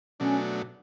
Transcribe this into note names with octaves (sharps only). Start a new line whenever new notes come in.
B2 F#3 A3 C#4 D4